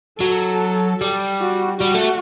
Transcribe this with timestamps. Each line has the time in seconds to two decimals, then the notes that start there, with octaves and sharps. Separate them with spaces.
0.21 F#3 A4
1.01 G3
1.41 F#4
1.81 G3 F#4
1.95 A3